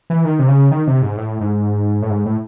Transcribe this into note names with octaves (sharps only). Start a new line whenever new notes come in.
E3
D#3
C3
C#3
D#3
C3
G#2
A2
G#2
A2
G#2
A2